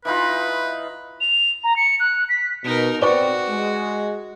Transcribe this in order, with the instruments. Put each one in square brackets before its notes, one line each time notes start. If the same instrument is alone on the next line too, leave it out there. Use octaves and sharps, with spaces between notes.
[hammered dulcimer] E3 D#4 F4 [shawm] B4
[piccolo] F7
A#5
C#7
F#6
B6
[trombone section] B2 [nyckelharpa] D#4 A#4
[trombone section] C4 [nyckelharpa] F#4 [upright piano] B4 D5 C#6
[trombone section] G#3